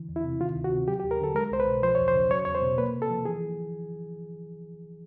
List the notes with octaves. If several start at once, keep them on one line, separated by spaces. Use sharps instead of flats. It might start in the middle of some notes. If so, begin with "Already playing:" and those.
Already playing: D3 E3
E2
E4
C3
D#3 F4
D2
F#4
C3
F#3 G4
G4
D#2
A#4
D3 A4
G#3 A#4
C2 C5
B4
B2
F3 C5
E2 C#5
C5
C#3
F#3 C#5
E2 C#5
C5
B2
A#3 B4
C3
A4
F3
E3 G#4